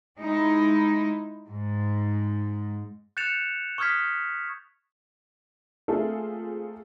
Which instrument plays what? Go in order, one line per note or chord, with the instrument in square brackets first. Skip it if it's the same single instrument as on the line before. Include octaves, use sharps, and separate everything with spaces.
[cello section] G#3 D#4 E4
G#2
[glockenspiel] F#6 G6 A6 C#7 E7 F7
C#6 D#6 F6 G#6 B6
[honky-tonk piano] A3 A#3 C4 F4 G#4 A4